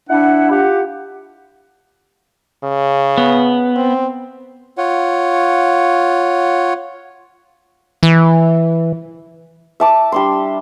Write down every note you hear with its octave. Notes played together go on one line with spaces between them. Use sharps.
D4 E4 F#5
F4 G4 F#5
C#3
B3
C4
F4 C#5 F#5
E3
E5 A5 D6
G3 D4 C6